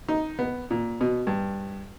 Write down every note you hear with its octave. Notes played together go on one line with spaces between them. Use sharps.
D#4
B3
A#2
B2
G2